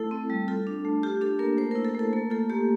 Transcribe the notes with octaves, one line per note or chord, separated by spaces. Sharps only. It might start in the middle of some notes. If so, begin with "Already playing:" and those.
Already playing: A3 E4 A4
C4
G3
F4 A4
D4
A3
F4 G4
D4 A4
A#3 A#4
A3 C5
E4 A#4
A4
A3 A4
A#3 A4
F4 A4
A#3 G4